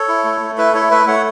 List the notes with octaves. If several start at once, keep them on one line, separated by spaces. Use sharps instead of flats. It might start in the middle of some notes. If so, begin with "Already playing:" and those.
Already playing: A4 C#5
E4
A3
A3
E4 B4 E5
E4 A4 C#5
A3 B4 E5
A3 C#5 F#5